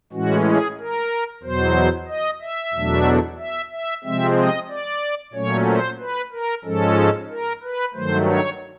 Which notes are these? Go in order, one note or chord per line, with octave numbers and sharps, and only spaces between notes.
A2 E3 G#3 C#4 F#4
G#4
A#4
E2 B2 F#3 C5
D#5
E5
E2 B2 F#3 A3 D4
E5
E5
C3 F3 G#3 C4 E5
D#5
D5
A#2 F#3 A3 C#4 C#5
C5
B4
A#4
G#2 F3 G#3 C#4 A4
A#4
B4
G2 D#3 F#3 A3 C5
C#5